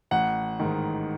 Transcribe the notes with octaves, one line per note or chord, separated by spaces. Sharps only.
A1 F#5
G#2 D#3